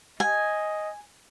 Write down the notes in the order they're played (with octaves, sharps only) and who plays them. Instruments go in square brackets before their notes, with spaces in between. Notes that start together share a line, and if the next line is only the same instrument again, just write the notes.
[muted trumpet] D#5 [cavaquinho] G#5